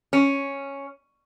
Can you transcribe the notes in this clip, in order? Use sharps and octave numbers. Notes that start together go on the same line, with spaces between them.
C#4